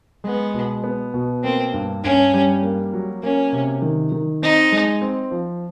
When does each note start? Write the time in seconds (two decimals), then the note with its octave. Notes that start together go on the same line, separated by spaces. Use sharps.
0.24 G#3 B3
0.54 B2
0.84 B3
1.14 B2
1.43 A#3 C4
1.73 G2
2.04 G2 C#4
2.34 G3
2.62 A#3
2.93 F#3
3.23 A#3 C#4
3.53 C3
3.82 D#3
4.12 D#3
4.42 C4 D#4
4.72 G#3
5.02 C4
5.31 F3